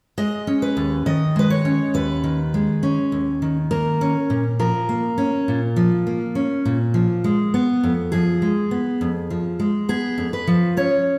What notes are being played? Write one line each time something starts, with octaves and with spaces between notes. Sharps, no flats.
G#3 D#5
C#4
B4
D#2
D#3 D#5
G#3 B4
C#5
C#4
D#2 B4
D#3
G#3
C#4
D#2
D#3
A#3 A#4
C#4
A#2
F3 A#4
A#3
C#4
A#2
F3
A#3
C#4
A#2
F3
G#3
B3
F2
F3 G#4
G#3
B3
F2
F3
G#3
B3 G#4
F2
B4
F3
C#4 C#5